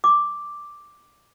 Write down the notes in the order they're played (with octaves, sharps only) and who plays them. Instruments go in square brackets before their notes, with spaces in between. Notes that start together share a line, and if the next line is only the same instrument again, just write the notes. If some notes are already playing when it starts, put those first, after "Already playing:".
[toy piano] D6